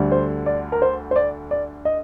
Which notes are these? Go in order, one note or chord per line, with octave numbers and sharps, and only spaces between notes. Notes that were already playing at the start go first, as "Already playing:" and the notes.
Already playing: D2 D3 G3
C5
D5
A#4
C5
C5
D5
D5
D#5